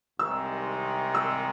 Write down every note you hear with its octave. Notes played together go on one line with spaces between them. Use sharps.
C2 C3 D#3 G#3 E6
E6